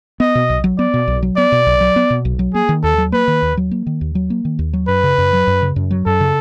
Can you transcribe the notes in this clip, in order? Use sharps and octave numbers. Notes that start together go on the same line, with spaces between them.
B3 D#5
B2
B1
F#3
B3 D5
B2
B1
F#3
B3 D5
B2
B1
F#3
B3
B2
B1
F#3
A#3 G#4
D#3
D#2 A4
F#3
A#3 B4
D#3
D#2
F#3
A#3
D#3
D#2
F#3
A#3
D#3
D#2
F#3
F#2 B4
C#3
F#2
F#3
F#2
C#3
F#2
F#3
F#2 A4
C#3